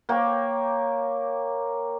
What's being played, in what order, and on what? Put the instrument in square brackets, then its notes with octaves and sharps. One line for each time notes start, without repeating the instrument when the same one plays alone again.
[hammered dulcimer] A#3 G4 C#5 G5